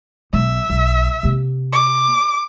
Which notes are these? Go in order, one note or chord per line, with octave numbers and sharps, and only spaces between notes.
B1 E5
B1
C3 A#3
D6